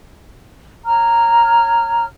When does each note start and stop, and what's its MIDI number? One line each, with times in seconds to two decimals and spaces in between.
0.86 2.04 73
0.86 2.04 82
0.86 2.04 89